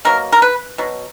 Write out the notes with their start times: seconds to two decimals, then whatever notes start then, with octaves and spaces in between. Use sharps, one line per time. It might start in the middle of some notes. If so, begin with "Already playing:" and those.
0.05 B2 F#3 A#3 A#4
0.32 A#4
0.42 B4
0.78 B2 F#3